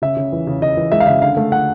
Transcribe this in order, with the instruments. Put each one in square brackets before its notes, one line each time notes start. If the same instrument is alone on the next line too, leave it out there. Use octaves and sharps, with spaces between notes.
[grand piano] C#3 E5
C#3
E3
C#3
C#3 D#5
E3
G#3 E5
F5
C#3 E5
D3 F5
A3
D3 F#5